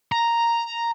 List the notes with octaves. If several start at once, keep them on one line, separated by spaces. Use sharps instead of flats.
A#5